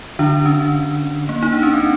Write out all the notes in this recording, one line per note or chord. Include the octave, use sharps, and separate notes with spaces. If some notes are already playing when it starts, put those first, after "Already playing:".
D3 D4
C#4
A#3
D#4
D4
C#4
C4